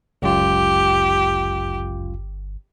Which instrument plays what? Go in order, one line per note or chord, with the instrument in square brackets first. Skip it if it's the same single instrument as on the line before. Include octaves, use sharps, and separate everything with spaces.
[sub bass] G1 [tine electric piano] C#2 F#2 F4 [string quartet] G4